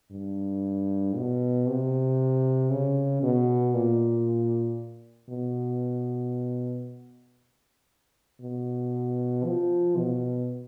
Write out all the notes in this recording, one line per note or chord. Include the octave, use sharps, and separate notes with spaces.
G2
B2
C3
C#3
B2
A#2
B2
B2
F3
B2